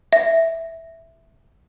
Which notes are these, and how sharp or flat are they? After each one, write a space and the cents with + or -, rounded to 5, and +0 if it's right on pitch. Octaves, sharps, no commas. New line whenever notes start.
E5 -5